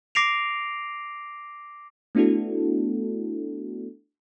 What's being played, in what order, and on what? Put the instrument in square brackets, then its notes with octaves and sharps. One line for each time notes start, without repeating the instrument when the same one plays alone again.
[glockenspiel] D6 A#6 C7 D7 F7
[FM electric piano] A3 B3 D4 E4 F#4 A4